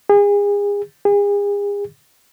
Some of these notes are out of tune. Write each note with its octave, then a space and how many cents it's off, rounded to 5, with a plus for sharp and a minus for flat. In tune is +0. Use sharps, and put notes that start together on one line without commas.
G#4 -35
G#4 -40